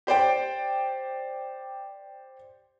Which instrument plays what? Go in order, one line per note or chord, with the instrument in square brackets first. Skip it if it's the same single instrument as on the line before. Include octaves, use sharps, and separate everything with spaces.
[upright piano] G4 C5 D5 G5